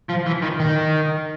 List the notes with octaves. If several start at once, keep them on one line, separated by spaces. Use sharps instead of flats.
F3
E3
D#3
D#3